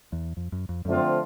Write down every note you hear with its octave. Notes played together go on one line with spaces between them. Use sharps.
E2
F2
F#2
F2
F#2 D3 F3 A3 C4 F4